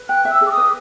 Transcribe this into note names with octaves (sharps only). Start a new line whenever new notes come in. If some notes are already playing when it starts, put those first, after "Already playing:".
Already playing: B4
G5 F#6
E5
E6
G#4
D6
D#6
B4